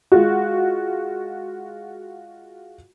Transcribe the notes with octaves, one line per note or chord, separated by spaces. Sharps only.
G#3 F4 F#4